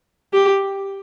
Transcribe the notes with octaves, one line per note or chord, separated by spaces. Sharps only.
G4